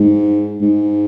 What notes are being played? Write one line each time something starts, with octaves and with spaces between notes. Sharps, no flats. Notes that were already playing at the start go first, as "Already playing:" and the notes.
Already playing: G#2
G#2